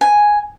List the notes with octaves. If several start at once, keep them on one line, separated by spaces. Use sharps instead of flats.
G#5